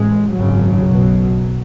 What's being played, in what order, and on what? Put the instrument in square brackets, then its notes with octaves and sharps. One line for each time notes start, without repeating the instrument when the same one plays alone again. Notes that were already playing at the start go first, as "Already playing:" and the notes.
Already playing: [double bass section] A1 G#3
G#1 F#2 C#3 F#3
B1 B2